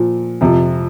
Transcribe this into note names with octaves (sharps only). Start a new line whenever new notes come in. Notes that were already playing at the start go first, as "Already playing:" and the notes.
Already playing: A#2 F3
F2 C3 F3